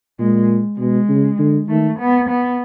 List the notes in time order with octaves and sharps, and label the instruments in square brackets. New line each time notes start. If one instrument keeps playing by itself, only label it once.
[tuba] A#2 [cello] G#3
[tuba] B2 [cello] G#3
[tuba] C#3
D3
[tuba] D#3 [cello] A3
[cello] B3
B3